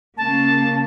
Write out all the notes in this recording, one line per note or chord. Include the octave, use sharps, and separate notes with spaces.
C#3 A#3 C#4 A5